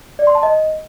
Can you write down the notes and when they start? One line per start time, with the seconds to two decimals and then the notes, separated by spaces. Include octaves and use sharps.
0.19 D5
0.27 C6
0.35 A5
0.43 D#5